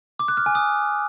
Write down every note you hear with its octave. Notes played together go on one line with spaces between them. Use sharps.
D6
F#6
F6
G#5
D#6